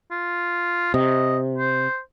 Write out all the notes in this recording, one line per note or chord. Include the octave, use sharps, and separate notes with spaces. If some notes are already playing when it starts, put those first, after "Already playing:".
F4
C3 D#5
C5